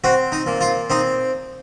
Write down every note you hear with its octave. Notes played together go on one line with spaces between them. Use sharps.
C4 F#4
D#4
A#2
F4
C4 D#4